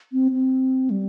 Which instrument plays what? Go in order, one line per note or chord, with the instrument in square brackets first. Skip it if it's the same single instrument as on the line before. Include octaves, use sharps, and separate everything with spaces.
[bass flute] C4
C4
G3